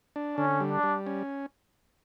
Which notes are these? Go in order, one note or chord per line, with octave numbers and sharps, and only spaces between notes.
D4
D3 C#4
G3
D4
G3
C#4